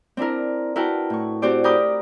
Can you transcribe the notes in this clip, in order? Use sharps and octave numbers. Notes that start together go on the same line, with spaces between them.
C4 D4 E4 A#4
E4 F#4 A#4 B4 G5 A5
A2 C#6
C4 F#4 G4 C5 D5
G4 A#4 B5 D6 D#6 G6